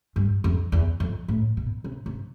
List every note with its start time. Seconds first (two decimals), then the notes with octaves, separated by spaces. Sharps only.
0.16 G2
0.44 F2
0.72 E2
1.00 F2
1.28 A2
1.57 B2
1.84 C3
2.06 C3